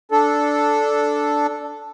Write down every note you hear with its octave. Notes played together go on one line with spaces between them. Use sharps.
D4 A4